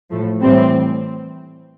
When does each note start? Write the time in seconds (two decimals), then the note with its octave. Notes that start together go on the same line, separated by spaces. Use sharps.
0.10 A2 F3 A3
0.41 A2 E3 G3 C4